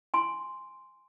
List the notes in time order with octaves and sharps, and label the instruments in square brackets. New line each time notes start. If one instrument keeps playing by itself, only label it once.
[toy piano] G#5 C6